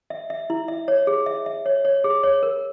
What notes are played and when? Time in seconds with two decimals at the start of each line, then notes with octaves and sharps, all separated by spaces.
0.10 E5
0.30 E5
0.50 E4
0.68 E5
0.88 C#5
1.07 G#4
1.26 E5
1.46 E5
1.66 C#5
1.85 C#5
2.04 G#4
2.23 C#5
2.43 A#4